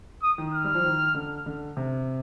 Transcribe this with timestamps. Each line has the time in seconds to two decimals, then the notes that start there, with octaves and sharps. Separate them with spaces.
0.23 D#6
0.38 D#3
0.54 F6
0.64 G3
0.75 F3
0.84 D#3
1.15 D3
1.46 D3
1.77 C3